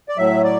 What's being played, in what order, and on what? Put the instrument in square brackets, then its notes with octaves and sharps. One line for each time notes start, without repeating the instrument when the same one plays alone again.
[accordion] D5
A2 F#3 E5
D5